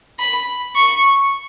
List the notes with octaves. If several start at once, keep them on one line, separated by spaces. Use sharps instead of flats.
B5
C#6